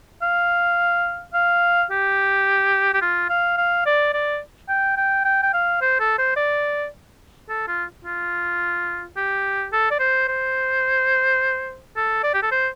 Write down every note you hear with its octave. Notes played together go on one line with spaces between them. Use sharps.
F5
F5
G4
G4
F4
F5
F5
D5
D5
G5
G5
G5
G5
F5
C5
A4
C5
D5
A4
F4
F4
G4
A4
D5
C5
C5
A4
D5
G4
A4
C5